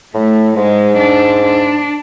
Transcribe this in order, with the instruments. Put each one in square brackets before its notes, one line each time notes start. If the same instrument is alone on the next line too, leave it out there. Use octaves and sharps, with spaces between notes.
[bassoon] A2 [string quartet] A3
[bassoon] G#2 [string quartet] G#3
[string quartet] D4
D4